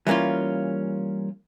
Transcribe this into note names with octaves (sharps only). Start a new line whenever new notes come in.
E3 G3 A#3 C#4 F4